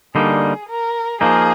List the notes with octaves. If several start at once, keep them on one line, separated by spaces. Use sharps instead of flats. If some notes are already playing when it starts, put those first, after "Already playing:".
D3 G3 A#3 D#4 G#4
A#4
F3 A#3 D#4 G#4